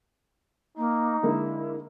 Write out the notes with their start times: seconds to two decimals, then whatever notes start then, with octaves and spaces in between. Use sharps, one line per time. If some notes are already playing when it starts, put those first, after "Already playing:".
0.77 A#3 D#4
1.23 D3 G#3 A#3 E4